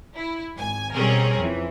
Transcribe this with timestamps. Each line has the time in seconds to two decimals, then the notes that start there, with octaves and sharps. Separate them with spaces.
0.17 E4
0.56 G#1 G#5
0.94 B2 G3 C4 C#4 G#4 A#4
1.39 F2 E3